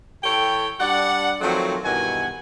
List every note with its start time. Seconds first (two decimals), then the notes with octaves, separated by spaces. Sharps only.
0.24 E3 A4 C#5 G5
0.81 G3 D4 D5 F#5
1.41 D#3 F3 F#3 A3 C4
1.84 G2 B2 D#3 E3 F#5 G#5